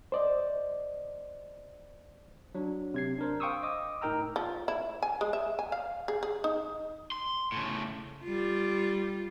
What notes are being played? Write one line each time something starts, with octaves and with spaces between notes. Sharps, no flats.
C5 D5 D#5
F#3 D4
C3 G#6 C7
D4 A#4 C5
F5 G5 C6 C#6 D#6 E6
D#5 D6 D#6
A2 D#4 A#4 G5 A#5 E6
F3
E4
G#5
G#3
E5
G#5
F5
G#4
G#4
D#4
C6
A2 C#3
G3 F4